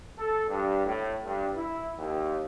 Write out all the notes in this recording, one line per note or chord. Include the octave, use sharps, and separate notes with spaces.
A4
G2
A2
G2
E4
D#2